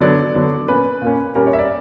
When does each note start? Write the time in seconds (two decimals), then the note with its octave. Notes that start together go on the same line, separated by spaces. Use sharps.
0.01 D3 F#3 B3 D4 D5
0.35 D3 F#3 B3 D4
0.68 A#2 A#3 C#4 B4
1.02 A#2 A#3 C#4
1.35 A#2 G3 A#3 C#4 A#4
1.47 C#5
1.53 E5
1.59 D5